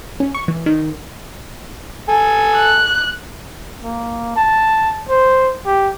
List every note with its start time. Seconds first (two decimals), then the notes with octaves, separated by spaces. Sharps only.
0.20 C#4
0.35 C#6
0.48 E3
0.66 D#3
2.09 A4 G#5
2.56 F#6
3.83 A#3
4.36 A5
5.09 C5
5.66 G4